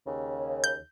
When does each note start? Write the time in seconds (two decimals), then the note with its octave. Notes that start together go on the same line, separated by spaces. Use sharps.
0.06 D#2 C#3
0.64 G6